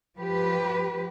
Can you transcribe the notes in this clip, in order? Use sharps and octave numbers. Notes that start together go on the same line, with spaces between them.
F3 G4 B4